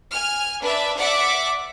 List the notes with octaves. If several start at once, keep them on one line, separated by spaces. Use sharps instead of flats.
G#5 F6
D4 B4 D5 E5
D5 E5 F#5 D6